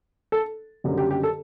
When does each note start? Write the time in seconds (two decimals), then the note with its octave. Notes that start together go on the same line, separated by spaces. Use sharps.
0.32 A4
0.84 F#1 F#2 D3 G3
0.98 G4
1.11 G4
1.23 A4